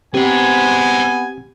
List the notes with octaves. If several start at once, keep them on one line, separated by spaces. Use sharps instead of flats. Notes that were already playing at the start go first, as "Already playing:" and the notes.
B3 C4 G4 G#4 C5 G#5